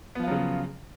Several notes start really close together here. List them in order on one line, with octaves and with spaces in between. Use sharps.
B3 F3 F4 F#3 C#3